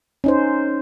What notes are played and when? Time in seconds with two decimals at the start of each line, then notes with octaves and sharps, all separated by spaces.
0.24 C#4 D#4 C5